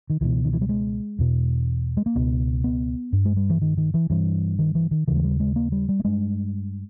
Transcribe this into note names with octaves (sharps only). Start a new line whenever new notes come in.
D#3
C#2 B2 E3
D#3
E3
G3
G#3
E2 B2
G#3
A#3
C#2 B2 B3
B3
G2
G#3
G3
E3
D#3
D#3
E3
G2 E3
D#3
E3
D#3
D#2 C#3 E3
G#3
G3
G#3
A#3
G3
G3
A#3
G2 G#3